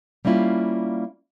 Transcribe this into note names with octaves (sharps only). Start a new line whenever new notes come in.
G3 A#3 C#4 E4 F4